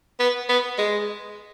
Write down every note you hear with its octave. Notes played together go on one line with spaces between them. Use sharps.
B3
B3
G#3